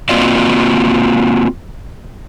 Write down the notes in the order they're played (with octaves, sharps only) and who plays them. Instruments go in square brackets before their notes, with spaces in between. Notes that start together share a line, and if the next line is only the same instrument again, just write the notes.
[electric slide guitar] A#3 C4 F4 F#4 D5 D#5